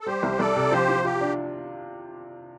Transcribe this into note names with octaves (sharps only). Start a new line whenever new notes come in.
A4
G3 G4 C5
C2
C2 A4 D5
C3
F3 G4 C5
F3
F4 G4
D4